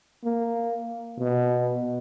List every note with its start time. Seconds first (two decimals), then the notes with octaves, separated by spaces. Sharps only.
0.24 A#3
1.20 B2